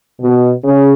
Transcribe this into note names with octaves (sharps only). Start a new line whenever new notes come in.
B2
C#3